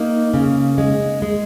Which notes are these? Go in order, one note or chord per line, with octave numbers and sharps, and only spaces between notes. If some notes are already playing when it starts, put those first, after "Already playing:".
Already playing: A#3 D#4
C#3
G#3
G#3